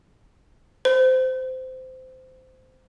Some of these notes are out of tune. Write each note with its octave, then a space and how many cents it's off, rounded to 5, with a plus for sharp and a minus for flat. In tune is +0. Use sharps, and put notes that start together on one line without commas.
C5 -20